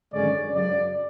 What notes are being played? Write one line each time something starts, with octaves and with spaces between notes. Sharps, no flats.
G#1 F#2 D3 G#3 C#4 D5
F#2 C#3 F#3 D5